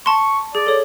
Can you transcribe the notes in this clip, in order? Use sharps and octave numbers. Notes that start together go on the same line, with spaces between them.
A5 C6 C#6
G#4 D5
A4 C#5